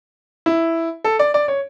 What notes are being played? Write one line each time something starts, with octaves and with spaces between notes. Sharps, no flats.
E4
A4
D5
D5
C#5